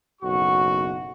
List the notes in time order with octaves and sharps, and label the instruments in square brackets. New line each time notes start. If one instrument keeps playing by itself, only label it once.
[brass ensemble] F#1 B1 F#4 [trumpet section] C#6